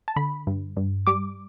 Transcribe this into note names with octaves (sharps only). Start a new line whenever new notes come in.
A5
D3 B5
G2
G2
G3 D6